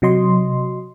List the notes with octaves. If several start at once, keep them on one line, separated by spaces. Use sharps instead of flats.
C3 F#3 D#5 C6